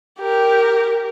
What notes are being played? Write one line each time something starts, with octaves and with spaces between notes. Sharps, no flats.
G4 A#4